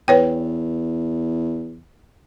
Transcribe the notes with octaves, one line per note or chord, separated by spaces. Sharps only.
E2 B4 C#5 G5